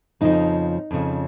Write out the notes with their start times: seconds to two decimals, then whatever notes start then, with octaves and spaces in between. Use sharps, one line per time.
0.21 F2 C#3 F3 D#4
0.91 F2 C#3 F3